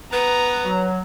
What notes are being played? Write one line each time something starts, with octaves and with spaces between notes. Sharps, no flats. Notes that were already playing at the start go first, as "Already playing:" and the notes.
B3 B4 A#5
F#3